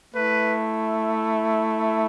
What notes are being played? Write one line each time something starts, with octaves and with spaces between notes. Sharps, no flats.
A3 E4 B4